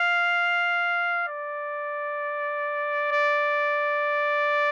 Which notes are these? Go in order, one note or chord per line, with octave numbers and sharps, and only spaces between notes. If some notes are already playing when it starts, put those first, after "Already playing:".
Already playing: F5
D5
D5